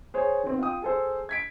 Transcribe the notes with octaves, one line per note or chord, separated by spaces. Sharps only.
G#4 C5 C#5
D#3 B3 C4
F4 F5 G5 D#6
G#4 A4 C5
G#6 B6 D7